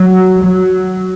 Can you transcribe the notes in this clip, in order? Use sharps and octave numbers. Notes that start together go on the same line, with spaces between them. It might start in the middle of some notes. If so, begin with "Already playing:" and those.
Already playing: F#3
F#3